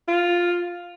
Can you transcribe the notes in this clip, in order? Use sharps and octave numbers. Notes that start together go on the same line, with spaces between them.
F4